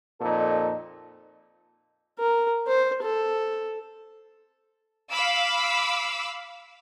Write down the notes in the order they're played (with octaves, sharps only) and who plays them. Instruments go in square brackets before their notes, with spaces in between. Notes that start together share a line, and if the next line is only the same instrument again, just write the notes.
[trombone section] F2 A#2 D#4 A4
[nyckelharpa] A#4
C5
A4
[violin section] F5 B5 D6 E6